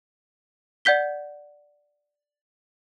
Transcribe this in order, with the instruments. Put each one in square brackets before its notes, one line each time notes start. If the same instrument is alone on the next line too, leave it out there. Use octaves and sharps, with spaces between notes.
[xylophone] D5 F#5 G6 B6 G7